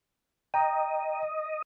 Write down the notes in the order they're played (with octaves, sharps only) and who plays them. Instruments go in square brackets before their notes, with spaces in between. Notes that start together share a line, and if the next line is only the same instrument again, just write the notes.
[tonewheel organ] D#5 [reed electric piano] G5 A#5